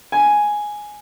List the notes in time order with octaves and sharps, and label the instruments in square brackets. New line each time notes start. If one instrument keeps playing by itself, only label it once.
[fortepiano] G#5